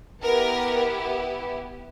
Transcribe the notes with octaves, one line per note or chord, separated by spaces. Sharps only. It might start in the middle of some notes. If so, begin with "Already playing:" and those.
B3 E4 G4 A#4